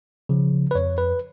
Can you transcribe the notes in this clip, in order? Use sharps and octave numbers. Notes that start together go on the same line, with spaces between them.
C#3 F3
B4
F2 C#5
B4